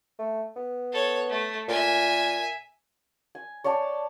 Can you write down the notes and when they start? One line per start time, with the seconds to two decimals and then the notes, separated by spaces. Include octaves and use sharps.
0.19 A3
0.56 B3
0.92 A4 C#5
1.29 A3
1.68 A#2 E5 G#5
3.35 G#5
3.64 C#5 D5 G5 A5